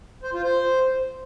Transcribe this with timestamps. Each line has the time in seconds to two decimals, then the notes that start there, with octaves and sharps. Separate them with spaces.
0.23 C5
0.33 F4
0.44 C5